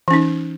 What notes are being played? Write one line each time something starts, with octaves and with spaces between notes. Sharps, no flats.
E3 C#4 D#4